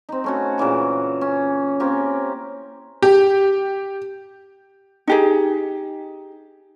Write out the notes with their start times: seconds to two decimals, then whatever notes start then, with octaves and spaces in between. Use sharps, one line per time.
0.09 C4 D#4
0.24 A3 C#4 F#4
0.58 A#2 C#3 E3 D6
1.21 C#4
1.80 A#3 C4 C#4 G4
3.02 G4
5.07 D#4 G4 G#4